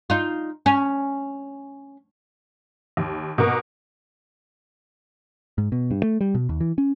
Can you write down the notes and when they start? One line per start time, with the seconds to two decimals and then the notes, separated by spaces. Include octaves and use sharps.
0.10 D#4 F4
0.66 C#4
2.97 D#2
3.38 B2 A#3
5.58 G#2
5.72 B2
5.91 G2
6.03 A3
6.21 G3
6.35 B2
6.49 D#2
6.61 E3
6.78 C#4